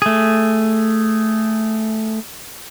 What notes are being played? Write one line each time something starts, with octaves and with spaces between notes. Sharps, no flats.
A3 G#4